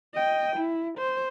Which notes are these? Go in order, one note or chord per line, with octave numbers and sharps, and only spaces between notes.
D#5 G5
E4
C5